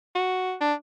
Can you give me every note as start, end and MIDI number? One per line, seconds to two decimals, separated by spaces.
0.15 0.54 66
0.61 0.74 62